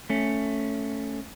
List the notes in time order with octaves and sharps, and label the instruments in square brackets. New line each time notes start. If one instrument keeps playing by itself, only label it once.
[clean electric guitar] A3 C#4